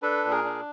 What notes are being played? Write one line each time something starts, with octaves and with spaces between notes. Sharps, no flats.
D4 A4 B4
A#2
G#4 A#4
D4